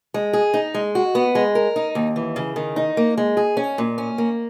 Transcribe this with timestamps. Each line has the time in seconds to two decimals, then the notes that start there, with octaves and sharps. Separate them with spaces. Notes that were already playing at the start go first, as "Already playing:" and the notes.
0.14 G#3
0.33 G#4
0.54 D#4
0.74 G#3
0.95 F#4
1.15 B3
1.35 G#3
1.55 A#4
1.76 D#4
1.95 D#2
2.16 E3
2.36 C#3
2.56 D#3
2.76 D#4
2.97 A#3
3.17 G#3
3.37 G#4
3.57 C#4
3.78 A#2
3.98 C#4
4.18 A#3